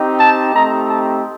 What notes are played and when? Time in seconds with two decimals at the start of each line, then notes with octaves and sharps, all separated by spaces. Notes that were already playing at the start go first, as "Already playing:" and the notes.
Already playing: C4 D#4 G4
0.18 A5
0.53 A3 C4 D#4 G4 A#5
0.88 A5